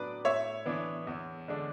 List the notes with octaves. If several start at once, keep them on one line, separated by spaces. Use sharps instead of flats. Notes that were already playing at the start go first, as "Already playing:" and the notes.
Already playing: A2 F#3 B3 D4 B4 D5
A2 C#5 E5
E3 B3 D4
E2
D3 G#3 D4